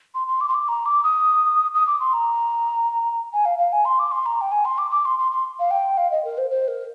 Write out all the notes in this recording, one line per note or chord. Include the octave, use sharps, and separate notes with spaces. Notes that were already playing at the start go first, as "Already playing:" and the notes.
C6
C6
D6
C6
D6
A#5
D6
D#6
D#6
D6
C6
A#5
G#5
F5
F5
G#5
C6
D6
C6
A#5
G5
G#5
C6
D6
D6
C6
C6
C6
F5
G5
F5
D#5
A#4
C5
C5
A#4